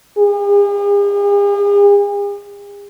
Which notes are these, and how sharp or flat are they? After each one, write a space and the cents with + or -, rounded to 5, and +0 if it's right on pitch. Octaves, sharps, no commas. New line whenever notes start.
G#4 -45